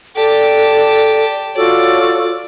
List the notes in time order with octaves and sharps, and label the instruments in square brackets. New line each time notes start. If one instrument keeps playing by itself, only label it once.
[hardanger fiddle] G4 A5 [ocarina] A4 [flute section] D5
[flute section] F4 F#4 A4 [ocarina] C#5 [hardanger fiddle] D5